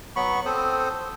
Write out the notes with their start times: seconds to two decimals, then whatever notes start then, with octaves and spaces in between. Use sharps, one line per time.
0.16 F#3 B3 B5 C#6
0.45 C4 A4 C5 D#6